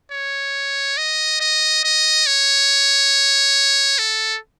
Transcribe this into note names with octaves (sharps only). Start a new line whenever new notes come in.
C#5
D#5
D#5
D#5
C#5
A4